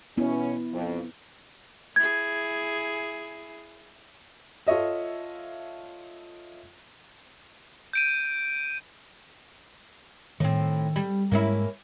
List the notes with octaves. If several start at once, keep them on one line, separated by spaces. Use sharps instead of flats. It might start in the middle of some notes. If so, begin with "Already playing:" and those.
B2 B3 C#4 E4
F2
E4 G#4 G#6
F4 A4 C#5 D#5 E5
G6 D7 D#7
A2 D#3 C4
G3
G#2 G#3 A#3 C#4 E4